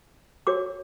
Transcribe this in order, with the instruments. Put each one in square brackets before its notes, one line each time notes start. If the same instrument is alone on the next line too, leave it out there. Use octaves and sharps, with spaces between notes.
[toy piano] F#4 A#4 C#5 D6